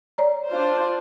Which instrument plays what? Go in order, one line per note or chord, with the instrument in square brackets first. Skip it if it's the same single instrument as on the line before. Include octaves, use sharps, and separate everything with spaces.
[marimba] C#5 D5 A#5
[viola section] D4 F4 C5